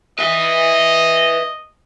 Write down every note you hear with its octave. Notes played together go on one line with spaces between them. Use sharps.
B4 D#5 E5